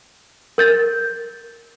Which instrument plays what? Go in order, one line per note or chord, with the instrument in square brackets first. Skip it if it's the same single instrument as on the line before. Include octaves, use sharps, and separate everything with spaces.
[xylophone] A#4 G6 A6